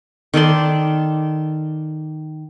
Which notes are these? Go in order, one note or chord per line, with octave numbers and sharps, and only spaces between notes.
D#3 A4 D5 C6